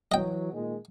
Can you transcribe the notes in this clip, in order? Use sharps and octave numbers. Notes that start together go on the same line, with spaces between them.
E3 F#3 D#5 G5
A#2 D#3 G#3